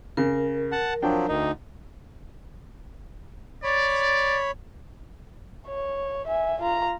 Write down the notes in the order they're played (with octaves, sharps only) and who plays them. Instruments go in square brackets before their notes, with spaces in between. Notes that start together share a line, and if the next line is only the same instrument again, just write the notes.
[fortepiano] C#3 [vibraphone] A#4
[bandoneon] F#5 A5
[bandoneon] F3 F#3 [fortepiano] D4 G5
[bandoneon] D2 D#4
[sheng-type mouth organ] C#5 B5 [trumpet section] D5
[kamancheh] C#5
E5 G#5
F4 A#5